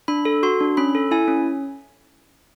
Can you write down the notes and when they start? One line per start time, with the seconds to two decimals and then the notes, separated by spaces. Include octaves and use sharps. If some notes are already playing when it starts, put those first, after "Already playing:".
0.08 D4 B5
0.25 A4
0.43 F#4 C6
0.60 D4
0.77 C#4 B5
0.95 A4
1.11 E4 G#5
1.28 C#4